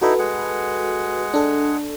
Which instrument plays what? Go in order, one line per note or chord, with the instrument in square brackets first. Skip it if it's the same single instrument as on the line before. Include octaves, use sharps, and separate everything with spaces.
[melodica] D#4 E4 [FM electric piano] F#4 A4 B4
[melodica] G#3 G#4 F#5
[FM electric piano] D4 A4